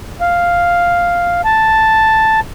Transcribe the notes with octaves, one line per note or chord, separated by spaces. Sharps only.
F5
A5